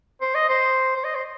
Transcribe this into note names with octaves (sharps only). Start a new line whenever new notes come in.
C5
D#5
C5
C5
D#5
C5